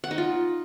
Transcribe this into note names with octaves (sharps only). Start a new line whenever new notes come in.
F#5
D#4
F4